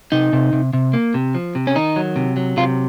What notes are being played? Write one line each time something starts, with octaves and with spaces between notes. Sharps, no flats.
C3 D#4
C3
C3
C3
A#3
C3
F3
C3
C#4
D#3 D#4
F#3
C3
F#3
C3 F4